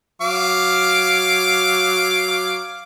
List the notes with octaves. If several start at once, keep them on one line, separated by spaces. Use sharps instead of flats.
F#3 F5 D6